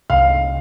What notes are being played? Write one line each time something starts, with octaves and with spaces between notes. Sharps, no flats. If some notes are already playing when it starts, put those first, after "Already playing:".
C2 F5